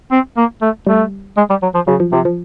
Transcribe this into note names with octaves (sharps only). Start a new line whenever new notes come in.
C4
A#3
A3
G3 A3
G#3
G3
F#3
F3
C#3 F#3
F3
C3 F3
F3